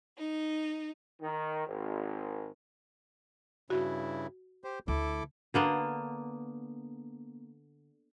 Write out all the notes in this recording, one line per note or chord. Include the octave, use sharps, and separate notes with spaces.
D#4
D#3
G#1
G2 C#3 E4 F#4
G4 C5
D2 E4 A4 D6
D3 A#3 B3